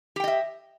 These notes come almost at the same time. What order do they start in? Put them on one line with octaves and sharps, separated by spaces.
G4 G5 D#5 E5